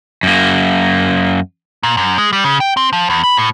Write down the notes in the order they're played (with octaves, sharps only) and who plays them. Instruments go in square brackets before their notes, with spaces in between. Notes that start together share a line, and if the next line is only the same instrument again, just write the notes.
[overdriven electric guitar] F#2 A#3
[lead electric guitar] A#2
F#2
G#3
G3
C#3
G5
C4
F3
E2
B5
A2